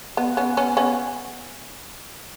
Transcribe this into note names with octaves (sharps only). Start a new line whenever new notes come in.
B3
B3 C#4
B3 C#4
B3 C#4